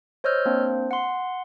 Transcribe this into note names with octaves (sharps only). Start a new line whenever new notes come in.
C5 C#5 D#5 E6 F6 G6
A#3 C4 D4 C5
F#5 C6